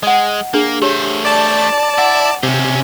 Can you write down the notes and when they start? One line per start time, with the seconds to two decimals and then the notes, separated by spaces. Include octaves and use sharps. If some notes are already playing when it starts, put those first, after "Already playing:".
0.03 G#3 D#5 F#5
0.54 A#3 D4 G#4
0.82 A3 G4 C5 C#5
1.25 D5 A5
1.98 E4 F#5
2.43 C3 C#4 C5